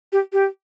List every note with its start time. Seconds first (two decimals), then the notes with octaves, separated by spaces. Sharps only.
0.12 G4
0.33 G4